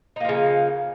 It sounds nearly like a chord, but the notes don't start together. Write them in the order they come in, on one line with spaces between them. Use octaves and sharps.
D#4 A#3 F3 C#3